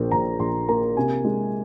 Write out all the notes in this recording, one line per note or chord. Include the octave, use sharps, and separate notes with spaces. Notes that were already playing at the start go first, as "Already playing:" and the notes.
Already playing: A#1 A#2 A#3 A#4 C5
A#1 A#5
A#1 C6
A#3 A#5
C3 G#5
G#3